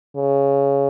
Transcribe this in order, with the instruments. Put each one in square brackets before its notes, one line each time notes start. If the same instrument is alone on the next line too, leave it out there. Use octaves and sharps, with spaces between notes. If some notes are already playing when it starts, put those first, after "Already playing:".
[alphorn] C#3